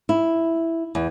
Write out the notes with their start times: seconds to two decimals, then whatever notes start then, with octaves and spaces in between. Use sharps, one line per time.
0.09 E4
0.95 E2